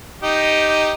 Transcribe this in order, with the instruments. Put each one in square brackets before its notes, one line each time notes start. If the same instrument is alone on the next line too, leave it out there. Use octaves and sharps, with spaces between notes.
[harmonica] D#4 G4 D#5